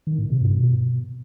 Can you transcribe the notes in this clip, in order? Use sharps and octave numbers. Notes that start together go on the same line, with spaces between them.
D#3
A2
C3
G2
B2